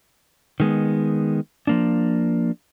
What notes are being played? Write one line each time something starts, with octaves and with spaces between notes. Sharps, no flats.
D#3 G#3 B3
F3 A#3 D4